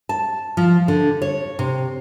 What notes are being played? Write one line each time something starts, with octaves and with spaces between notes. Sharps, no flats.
A5
F3
D3
C#5
C3